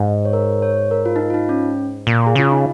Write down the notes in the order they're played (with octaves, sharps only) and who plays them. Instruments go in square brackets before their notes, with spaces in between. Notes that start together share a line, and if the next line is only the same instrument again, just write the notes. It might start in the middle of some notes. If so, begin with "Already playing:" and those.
Already playing: [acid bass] G#2
[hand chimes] C#5
A#4
C#5
A#4
F4
D#4
F4
F4
D#4
C#4
[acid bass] A#2
[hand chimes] G#4
[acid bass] C#3 [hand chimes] F4
[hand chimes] D#4